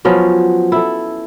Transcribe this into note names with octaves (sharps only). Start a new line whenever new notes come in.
F3 F#3 B3 C#4
E4 A4